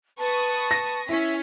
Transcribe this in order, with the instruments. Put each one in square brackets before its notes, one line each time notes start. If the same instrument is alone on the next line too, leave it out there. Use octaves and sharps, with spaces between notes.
[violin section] B4 C#6 D#6 [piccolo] A5
[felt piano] A#6
[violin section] C#4 B6 [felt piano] E4 [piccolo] E5